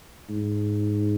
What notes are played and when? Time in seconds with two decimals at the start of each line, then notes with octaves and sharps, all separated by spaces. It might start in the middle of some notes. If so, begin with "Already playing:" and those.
0.29 G#2